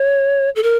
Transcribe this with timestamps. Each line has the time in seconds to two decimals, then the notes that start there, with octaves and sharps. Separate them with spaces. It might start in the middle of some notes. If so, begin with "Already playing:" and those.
Already playing: C#5
0.56 A4
0.63 A#4